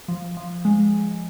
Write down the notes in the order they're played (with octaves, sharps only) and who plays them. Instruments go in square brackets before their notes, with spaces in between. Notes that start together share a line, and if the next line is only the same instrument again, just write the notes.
[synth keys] F3
F3
G#3